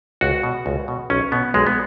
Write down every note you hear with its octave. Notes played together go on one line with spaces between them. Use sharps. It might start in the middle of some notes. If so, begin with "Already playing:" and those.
C#2 F#4
B2
C#2
B2
B1 C#4
B2 B3
B1 G#3
B3